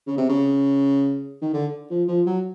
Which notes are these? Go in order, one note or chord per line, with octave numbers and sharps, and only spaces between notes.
C#3
C3
C#3
D#3
D3
F3
F3
F#3